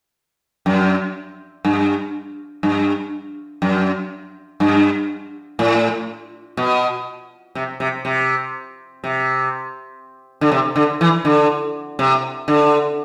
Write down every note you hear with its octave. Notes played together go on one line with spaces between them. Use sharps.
F#2
G2
G2
F#2
G2
A2
B2
C3
C3
C3
C3
D3
C3
D3
E3
D3
C3
D3